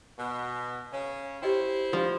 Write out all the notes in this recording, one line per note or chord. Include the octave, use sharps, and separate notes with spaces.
B2
C#3 C#4
E4 G4 C5 D#5 G5
F3 D4 G4 D5